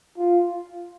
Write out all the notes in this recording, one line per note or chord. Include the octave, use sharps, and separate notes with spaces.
F4